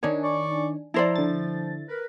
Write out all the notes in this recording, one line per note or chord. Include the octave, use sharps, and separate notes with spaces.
D#3 D4 D#4 C#5 G#5
D5 C#6
F3 E4 C5 D5 A5 A#5
D3 A6
A#4 B4